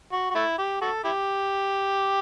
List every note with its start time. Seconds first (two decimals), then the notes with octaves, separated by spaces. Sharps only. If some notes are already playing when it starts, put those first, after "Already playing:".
0.12 F#4
0.30 F#4
0.35 A3 E4
0.58 G4
0.81 F#4 A4
1.04 E4 G4